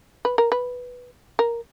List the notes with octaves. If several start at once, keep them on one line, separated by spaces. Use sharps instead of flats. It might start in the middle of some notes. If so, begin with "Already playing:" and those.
B4
A#4
B4
A#4